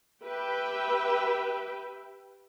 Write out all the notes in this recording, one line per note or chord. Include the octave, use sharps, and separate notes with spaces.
G4 B4 E5 G5